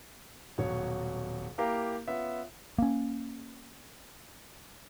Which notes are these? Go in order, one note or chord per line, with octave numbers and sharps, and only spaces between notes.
D#1 B2 F#3 C#5
A#3 E4 G4 A#4 F5 A#5
B3 C#4 F4 E5
A#3 C#4